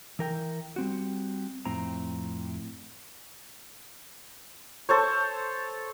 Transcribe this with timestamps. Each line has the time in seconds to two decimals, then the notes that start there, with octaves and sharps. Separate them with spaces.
0.19 E3 A#4 G5
0.76 G3 C4 F#4
1.65 F2 A2 C4 A#5
4.89 A4 C5 C#5